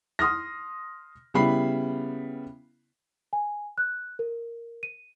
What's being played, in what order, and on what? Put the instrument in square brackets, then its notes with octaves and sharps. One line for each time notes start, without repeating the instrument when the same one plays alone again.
[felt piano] C6 D#6 F6 A#6
C#3 G3 B3 E4 B5 C7
[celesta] G#5
F#6
A#4
D#7